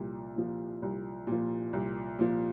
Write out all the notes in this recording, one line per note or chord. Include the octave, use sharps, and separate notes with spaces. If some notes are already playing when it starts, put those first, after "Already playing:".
Already playing: C2 A#2 F3
A#2 F3
C2
A#2 F3
C2
A#2 F3